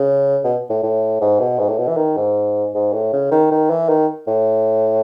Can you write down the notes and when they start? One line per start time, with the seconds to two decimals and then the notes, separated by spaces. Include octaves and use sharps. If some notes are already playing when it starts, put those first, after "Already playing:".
Already playing: C#3
0.44 B2
0.70 A2
0.83 A2
1.21 G#2
1.40 B2
1.59 G#2
1.69 A2
1.78 B2
1.88 E3
1.97 D#3
2.17 G#2
2.74 G#2
2.93 A2
3.13 C#3
3.31 D#3
3.51 D#3
3.70 E3
3.89 D#3
4.27 A2